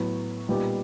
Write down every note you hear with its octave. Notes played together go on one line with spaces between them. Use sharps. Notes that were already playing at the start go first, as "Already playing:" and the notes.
Already playing: A2 F#3 B3
A#2 G3 B3 D#4 G4